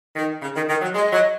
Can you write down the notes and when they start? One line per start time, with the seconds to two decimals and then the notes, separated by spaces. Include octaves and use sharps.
0.16 D#3
0.42 C#3
0.55 D#3
0.69 D#3
0.82 F#3
0.94 G#3 D#5
1.12 F#3